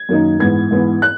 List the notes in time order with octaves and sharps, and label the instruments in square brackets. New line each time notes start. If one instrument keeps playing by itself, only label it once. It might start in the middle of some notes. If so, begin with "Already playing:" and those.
Already playing: [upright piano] G#6
F#2 D#3 A#3 D#4
G#2 E3 B3 G#6
G#2 E3 B3
F#6